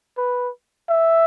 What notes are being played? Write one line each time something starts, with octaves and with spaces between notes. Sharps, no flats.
B4
E5